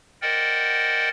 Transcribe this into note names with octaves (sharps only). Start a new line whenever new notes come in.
A#4 C5 D5 D#5 F#5 G5